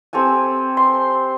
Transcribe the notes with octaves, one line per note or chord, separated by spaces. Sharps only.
C4 G4 A4 G#5
C6